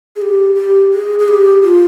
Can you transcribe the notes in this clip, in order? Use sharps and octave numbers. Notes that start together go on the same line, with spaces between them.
G#4
G4
G4
G#4
G#4
G4
F4